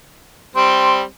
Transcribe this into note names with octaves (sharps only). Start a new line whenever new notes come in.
G3 C4 C6